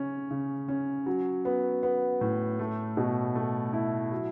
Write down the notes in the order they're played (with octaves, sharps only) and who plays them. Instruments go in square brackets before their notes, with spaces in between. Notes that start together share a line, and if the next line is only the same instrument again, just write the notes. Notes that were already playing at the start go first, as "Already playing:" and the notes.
Already playing: [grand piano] C#3 C#4
C#3
C#4
F#3
B3
B3
A2
A3
B2
A3
E4
F#3